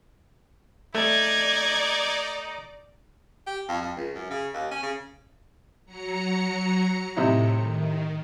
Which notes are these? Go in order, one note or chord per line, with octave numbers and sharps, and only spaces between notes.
A3 D#4 D5 G#6
G4
F2
F2
C#2
F#2
C#3
D#2
C#4
C#3
F#3 A#5 C#7
A2 C3 D#4 E4
D#3